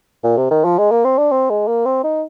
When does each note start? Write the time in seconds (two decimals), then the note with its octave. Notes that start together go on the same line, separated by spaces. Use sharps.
0.24 A#2
0.37 C3
0.51 D#3
0.65 F3
0.78 G#3
0.91 A#3
1.05 C4
1.18 D4
1.32 C4
1.50 G#3
1.68 A#3
1.86 C4
2.04 D#4